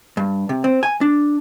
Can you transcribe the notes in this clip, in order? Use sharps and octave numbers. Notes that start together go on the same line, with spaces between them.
G2
C3
C4
G#5
D4